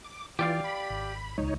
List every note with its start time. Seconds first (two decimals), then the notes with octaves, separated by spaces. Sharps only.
0.04 D6
0.39 E3 F4 G4 D5 F5
0.64 B5
0.90 G#1
1.38 D#1 C#2 G#3 D#4 C#5